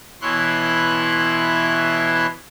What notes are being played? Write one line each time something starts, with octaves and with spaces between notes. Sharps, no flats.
B2 E3 E4 C#5 C6 F#6